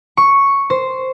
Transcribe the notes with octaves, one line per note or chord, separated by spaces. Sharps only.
C#6
C5